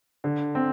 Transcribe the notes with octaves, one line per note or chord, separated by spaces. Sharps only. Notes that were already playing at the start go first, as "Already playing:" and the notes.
D3
C4